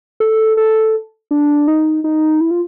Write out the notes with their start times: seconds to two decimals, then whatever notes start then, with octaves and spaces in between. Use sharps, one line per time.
0.20 A4
0.57 A4
1.31 D4
1.68 D#4
2.04 D#4
2.41 E4
2.51 F4